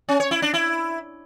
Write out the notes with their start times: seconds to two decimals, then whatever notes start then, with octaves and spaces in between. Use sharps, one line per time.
0.09 C#4
0.20 C#5
0.31 E4
0.42 D4
0.54 E4